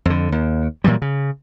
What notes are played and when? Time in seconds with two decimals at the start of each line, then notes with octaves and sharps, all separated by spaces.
0.05 F2 D3
0.32 D#2
0.84 A#2 E3 F#3 G3
1.02 C#3